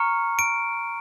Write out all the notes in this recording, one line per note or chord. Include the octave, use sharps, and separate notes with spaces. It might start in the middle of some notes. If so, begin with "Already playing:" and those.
Already playing: A#5 C#6 F6 C#7
D7